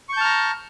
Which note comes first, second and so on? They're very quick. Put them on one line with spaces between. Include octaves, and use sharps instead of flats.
C#6 G6 A5 F6 A#5